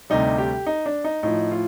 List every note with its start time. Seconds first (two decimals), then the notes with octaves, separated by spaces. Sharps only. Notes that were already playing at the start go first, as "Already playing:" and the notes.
0.10 D2 C3 G3 D#4
0.38 G4
0.67 D#4
0.86 D4
1.04 D#4
1.23 A2 F3 D#4
1.51 F4